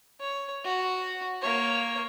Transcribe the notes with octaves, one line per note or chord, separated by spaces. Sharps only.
C#5
F#4
A#3 C#5